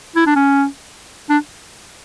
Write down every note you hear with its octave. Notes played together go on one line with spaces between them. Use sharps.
E4
D4
C#4
D4